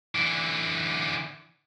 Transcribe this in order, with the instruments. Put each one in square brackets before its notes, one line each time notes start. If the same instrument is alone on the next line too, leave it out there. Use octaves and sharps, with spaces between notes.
[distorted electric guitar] D3 E3